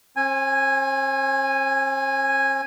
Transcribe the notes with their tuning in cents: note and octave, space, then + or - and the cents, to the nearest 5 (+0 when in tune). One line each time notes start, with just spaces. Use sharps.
C4 +45 G#5 -10